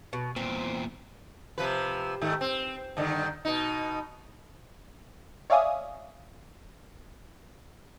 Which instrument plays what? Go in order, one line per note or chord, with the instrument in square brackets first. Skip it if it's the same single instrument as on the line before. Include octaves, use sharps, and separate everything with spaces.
[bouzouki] B2
[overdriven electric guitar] E2 A#2 [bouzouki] C4
[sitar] C3 F3 B4
G#2 D#3 A3
C4
G2 D3 D#3
B2 D#4
[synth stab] C#5 D5 E5 F5 G#5 D#6